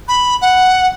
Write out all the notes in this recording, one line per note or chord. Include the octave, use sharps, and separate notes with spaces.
B5
F#5